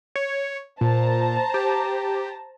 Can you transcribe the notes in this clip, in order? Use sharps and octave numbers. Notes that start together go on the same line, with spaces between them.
C#5
A#2 C5 A5 A#5
G4